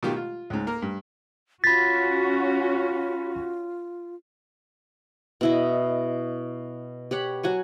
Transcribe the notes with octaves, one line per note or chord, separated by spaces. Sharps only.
B2 D#3 F4 G4
F4
C#2 G#2
A#3 A#4
G2
C#4 F4 F#4 B5 A6 B6
B2 E4 D#5
G4 C#5 F#5 B5
F#3 F#4 G#5 C#6